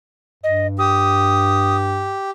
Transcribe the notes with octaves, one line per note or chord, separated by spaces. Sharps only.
G2 D#5
G4 D#6